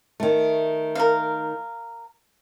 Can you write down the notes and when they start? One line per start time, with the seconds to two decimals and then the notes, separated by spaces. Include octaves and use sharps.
0.20 D#3 A3
0.95 A#4 F5